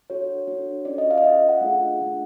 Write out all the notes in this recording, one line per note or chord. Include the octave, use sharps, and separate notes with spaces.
D4 F#4 A4 C#5
D4 F#4 A4
C#4 F4 A4 D5
D#5
F5
D#5
C#4 F4 A4 E5
F5
F#5
A3 D4 F4 G#4
A3 D4 F4 G#4